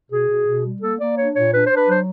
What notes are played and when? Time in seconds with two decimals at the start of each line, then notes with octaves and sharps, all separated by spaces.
0.11 B2 G#4
0.29 B2
0.47 B2
0.65 G3
0.82 A#3 A4
0.99 A#3 D5
1.17 D4 C#5
1.35 A#2 C#5
1.53 D4 B4
1.66 D4 C5
1.76 B4
1.88 F#3 C5